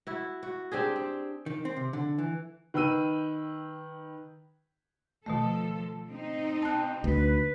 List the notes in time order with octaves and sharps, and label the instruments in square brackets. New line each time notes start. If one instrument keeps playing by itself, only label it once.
[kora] E4 F#4
F#4
C4 D4 G4 G#4
C4
[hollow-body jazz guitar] D#3
C4
C3
D3
E3
[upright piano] D#3 B4 G5 E6 D#7
[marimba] B2 D#3 A3 [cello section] F3 A4
[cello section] C4 D#4
[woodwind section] B2 G5 [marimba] A5 F#6
[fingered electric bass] D2 [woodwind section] B4